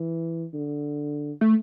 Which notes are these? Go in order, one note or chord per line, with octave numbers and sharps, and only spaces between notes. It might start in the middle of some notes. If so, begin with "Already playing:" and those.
Already playing: E3
D3
A3